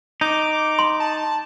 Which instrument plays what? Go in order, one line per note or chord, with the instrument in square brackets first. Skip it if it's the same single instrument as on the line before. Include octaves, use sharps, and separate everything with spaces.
[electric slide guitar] D#4 [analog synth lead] D6
[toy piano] C6
[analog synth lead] A5